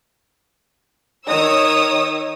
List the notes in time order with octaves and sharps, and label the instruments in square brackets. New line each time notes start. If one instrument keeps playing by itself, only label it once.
[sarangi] D#3 [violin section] C#5 D#6 E6